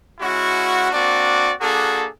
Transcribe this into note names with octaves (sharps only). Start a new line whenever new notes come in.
G#3 C#4 E4 F#4
A#3 C4 D4 F#4 D5
A#3 D4 F#4 G#4 A4